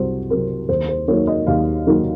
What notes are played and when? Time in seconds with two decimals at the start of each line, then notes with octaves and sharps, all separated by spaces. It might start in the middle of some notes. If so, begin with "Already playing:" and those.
Already playing: C2 C3 F#3 C5
0.30 C3 F#3 C4 A#4
0.69 D#2 C5
0.89 C5
1.08 D#3 F#3 A#3 D#4 C#5
1.27 D#5
1.47 D#2 F5
1.87 D#3 F#3 A#3 D#4